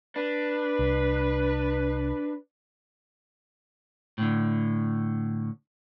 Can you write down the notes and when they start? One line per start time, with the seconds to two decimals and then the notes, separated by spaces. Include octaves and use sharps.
0.16 D4 B4
0.79 C2
4.18 A2 D3